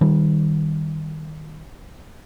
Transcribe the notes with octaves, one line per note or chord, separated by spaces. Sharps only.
D#3 G3